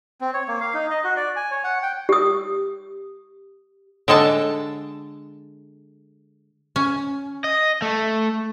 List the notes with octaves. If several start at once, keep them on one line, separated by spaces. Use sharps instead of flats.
C4
C#5
A#3
F5
D#4
D#5
F#4
D5
G#5
C#5
F#5
G5
G4 D#6
D3 G#3 A4 A5
C#4
D#5
A3